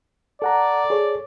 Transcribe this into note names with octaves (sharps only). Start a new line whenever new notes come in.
A4 D5 F#5 A#5
G#4 A4 C#5